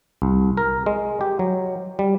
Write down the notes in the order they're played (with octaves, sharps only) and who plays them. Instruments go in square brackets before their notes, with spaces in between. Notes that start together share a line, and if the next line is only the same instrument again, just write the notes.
[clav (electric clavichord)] C2
A#4
G#3
G4
F#3
G3